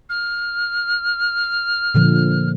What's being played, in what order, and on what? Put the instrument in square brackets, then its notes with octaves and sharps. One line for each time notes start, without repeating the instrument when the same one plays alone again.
[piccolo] F6
[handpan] A#2 D3 F3